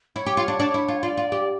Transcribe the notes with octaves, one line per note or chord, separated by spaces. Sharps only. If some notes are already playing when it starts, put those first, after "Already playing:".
E4 C#5
G4
F4
D4
D4
E4
F4
F4 D5
F4
G4